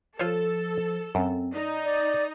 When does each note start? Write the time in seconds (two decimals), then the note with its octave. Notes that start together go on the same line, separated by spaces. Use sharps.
0.19 F3 F4 A4 C5 C#5
1.15 F#2 C4
1.54 D#4 D5
1.84 D5 D#6